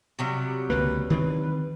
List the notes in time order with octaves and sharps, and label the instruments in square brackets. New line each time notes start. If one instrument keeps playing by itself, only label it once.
[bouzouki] C3 F#3 G3
[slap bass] C#2 D3 A#3 [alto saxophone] B4
[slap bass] D#3 E3 C4 [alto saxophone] B4